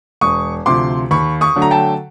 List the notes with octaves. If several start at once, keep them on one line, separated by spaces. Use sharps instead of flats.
E1 C#6 D#6
D2 C3 F3 C6 D6
D#2 B5 C#6
C#6 D#6
D3 F#3 A3
A#5
G5 A5